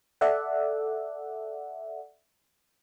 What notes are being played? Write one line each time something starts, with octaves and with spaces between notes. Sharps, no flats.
A4 D5 E5 F#5